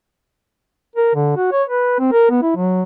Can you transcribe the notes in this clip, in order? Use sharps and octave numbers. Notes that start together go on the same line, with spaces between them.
A#4
D3
F#4
C#5
B4
C4
A#4
B3
E4
F#3